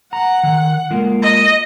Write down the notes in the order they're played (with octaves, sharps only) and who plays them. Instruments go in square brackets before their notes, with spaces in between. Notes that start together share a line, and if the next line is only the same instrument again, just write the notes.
[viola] F#5 [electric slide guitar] A#5
[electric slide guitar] D#3
G#3 A#3 F4
[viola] D#5